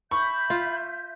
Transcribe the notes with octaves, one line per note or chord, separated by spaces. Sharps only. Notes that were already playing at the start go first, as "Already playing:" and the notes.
E5 B5 C#6 G6
F4